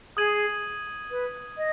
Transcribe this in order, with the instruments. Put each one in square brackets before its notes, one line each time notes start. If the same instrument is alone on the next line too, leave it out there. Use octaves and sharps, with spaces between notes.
[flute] G#4 [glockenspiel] D#6 G#6 D#7 F#7
[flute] B4
D#5